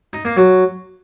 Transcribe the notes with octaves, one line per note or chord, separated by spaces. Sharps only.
D#4
A#3
F#3